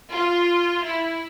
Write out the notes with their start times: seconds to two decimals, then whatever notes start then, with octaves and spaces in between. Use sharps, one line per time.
0.13 F4
0.85 E4